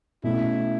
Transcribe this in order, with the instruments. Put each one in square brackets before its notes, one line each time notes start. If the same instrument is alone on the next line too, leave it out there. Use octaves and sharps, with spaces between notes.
[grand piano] B2 A3 C#4 [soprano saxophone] E4